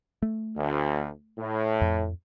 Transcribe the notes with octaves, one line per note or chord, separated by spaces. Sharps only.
A3
D2
A2
F2